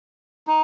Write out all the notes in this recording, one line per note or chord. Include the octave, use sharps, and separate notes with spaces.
D#4